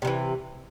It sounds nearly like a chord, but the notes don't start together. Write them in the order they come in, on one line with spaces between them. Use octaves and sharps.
C3 G3 E3